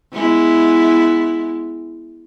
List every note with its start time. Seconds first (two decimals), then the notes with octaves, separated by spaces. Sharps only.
0.13 G#3 B3 E4